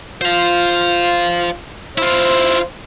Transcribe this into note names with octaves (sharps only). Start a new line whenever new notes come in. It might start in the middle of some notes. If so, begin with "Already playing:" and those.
F4 C5 F5
E4 F4 C5